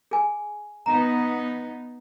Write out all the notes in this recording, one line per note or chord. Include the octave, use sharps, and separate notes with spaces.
G#4 G#5
B3 D#4 A#5